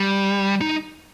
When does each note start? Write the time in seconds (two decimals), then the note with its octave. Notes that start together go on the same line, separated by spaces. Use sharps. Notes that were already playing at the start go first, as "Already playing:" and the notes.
Already playing: G3
0.61 D#4